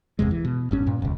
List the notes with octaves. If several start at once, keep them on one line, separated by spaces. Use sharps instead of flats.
F#1 E2 C3 G#3
E3
B2
G#1 G2 C#4
G2 A#2
E1 C#2